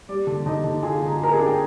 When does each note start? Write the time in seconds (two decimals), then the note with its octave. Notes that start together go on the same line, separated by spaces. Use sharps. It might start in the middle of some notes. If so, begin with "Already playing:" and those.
0.09 G3 D5
0.27 D3
0.46 D3 D#4 D#5
0.64 D3
0.83 F4 G#4 G#5
1.02 D3
1.08 A#5
1.21 F4 A#4 A#5
1.32 G#4 G#5
1.39 D4
1.46 G5